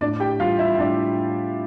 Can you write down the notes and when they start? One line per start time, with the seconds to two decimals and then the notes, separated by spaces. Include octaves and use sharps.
0.01 A2 D4 D5
0.20 G4 G5
0.40 E3 G3 F4 F5
0.59 E4 E5
0.79 A2 D4 D5